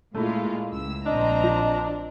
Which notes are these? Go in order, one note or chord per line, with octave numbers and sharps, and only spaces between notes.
A#2 G#3 A3 E4 F4
C#2 E6
A#1 C4 D4 D#5 A#5
F3